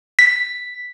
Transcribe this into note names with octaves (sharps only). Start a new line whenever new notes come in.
B6